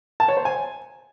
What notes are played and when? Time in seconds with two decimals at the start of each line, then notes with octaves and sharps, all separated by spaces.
0.20 A5
0.28 C#5
0.37 C5
0.45 G#5